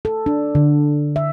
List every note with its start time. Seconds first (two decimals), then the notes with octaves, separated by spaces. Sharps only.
0.05 A4
0.26 D4
0.55 D3
1.16 E5